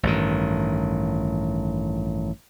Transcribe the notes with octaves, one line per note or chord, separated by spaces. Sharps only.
A1 G2 D#3